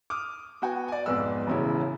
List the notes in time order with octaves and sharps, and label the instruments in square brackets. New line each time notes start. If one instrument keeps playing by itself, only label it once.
[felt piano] D6 D#6 F6
B3 F#4 G5 G#5
D5 G#5
B1 F2 G#2 B4 D5 E6
E1 A1 C#3 E4